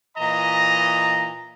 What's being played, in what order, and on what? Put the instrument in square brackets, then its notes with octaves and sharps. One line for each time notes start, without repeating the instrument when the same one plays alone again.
[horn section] A#2 E3 A#5 [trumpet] D#5